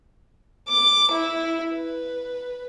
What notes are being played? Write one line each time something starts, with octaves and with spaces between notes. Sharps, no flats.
D6
E4
B4